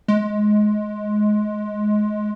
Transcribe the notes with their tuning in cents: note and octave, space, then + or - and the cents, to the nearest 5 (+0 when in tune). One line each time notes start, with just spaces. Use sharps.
G#3 +20